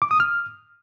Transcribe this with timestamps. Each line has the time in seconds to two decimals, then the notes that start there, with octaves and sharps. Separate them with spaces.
0.02 D6
0.11 D#6
0.20 F6